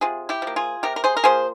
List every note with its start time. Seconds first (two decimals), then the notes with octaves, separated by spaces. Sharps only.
0.01 C3 F4 G#4
0.29 E4 G4
0.42 F3
0.47 A#3
0.56 F4 G#4
0.83 C3 G4 A#4
0.96 A#4
1.04 G#4 C5
1.17 A#4
1.24 F3 A#3 G#4 C5